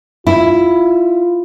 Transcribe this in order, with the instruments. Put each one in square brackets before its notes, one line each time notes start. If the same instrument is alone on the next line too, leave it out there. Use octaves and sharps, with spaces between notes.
[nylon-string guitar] E4 [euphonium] F4